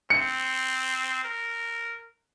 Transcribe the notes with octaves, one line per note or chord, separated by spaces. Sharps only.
C4 C#7
A#4